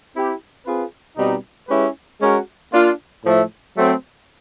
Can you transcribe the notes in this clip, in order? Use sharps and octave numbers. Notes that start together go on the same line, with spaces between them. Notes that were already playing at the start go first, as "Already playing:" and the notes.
C4 E4 G4
C4 F4 G#4 B4
B2 G3 C4 D#4
G#3 C#4 E4 G4 B4
G#3 C#4 F#4 A#4 C#5
A#3 D4 F4
A2 F3 A3
F#3 A3 C4